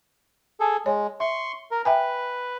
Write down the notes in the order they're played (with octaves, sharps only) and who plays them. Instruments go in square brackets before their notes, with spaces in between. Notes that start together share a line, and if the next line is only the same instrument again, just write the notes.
[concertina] G#4 A4
[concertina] G#3 [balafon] C#5
[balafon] E5 [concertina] C6 C#6
[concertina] A#4
[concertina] B4 [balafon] E5 G5 G#5